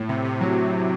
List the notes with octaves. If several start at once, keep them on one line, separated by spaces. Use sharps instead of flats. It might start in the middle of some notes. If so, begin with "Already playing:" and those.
Already playing: A2
C3
C3
F#3